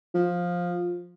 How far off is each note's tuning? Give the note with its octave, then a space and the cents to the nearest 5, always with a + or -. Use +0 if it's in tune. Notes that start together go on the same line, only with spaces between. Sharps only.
F3 +10